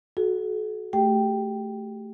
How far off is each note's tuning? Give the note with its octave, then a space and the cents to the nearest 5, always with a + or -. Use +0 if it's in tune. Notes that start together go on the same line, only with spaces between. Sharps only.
F#4 +0 A4 -45
A3 +0 G4 +0 G5 +0